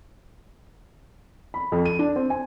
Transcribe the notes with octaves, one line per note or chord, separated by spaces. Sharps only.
B5
F2
D#7
D4
C4
G#5